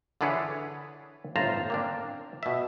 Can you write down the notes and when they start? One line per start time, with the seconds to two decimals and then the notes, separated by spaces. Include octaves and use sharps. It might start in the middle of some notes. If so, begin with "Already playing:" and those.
0.21 D3 E3 D4 G#4 B4 C#5
1.36 G1 A2 F4 C5 A5 A#5
1.70 A#3 C4 D4
2.43 B2 E5